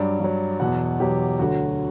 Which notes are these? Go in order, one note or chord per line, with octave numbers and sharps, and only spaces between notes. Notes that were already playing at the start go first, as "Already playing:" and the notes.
Already playing: G2 F#3 D5
G2 F#3
E2 B2 F#3 F#5
E2 B2 F#3 G4
D2 D3 F#3 F#4